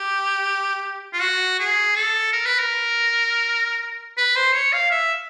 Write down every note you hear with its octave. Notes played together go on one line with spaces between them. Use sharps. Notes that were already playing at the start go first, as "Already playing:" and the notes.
Already playing: G4
F4
F#4
G#4
A4
A#4
B4
A#4
B4
C5
C#5
F5
E5